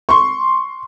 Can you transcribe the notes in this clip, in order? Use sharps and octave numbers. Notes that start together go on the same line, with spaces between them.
C6 C#6